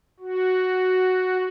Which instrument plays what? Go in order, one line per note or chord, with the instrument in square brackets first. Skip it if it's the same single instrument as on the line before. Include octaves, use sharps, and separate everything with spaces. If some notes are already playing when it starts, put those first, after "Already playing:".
[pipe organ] F#4